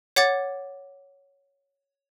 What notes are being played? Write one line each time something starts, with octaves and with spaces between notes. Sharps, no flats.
C#5 F#5 D6 A6